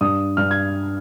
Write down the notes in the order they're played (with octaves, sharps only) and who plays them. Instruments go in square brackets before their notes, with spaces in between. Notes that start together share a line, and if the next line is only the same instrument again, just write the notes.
[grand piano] G2 D#6
G2 F6
G#6